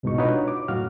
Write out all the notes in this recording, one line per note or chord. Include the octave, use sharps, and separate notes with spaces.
C2 G#2 B2 G#3 D#4 C#6
D4 D#4 F4 F#4 B4 C#5
D6
F#2 A2 F#4 F5 F6